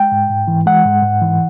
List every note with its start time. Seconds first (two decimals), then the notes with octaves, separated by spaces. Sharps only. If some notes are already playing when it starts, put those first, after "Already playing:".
Already playing: G#3 G5
0.12 G#2
0.30 G#2
0.48 E3
0.66 G#3 F#5
0.85 G#2
1.02 G#2
1.22 E3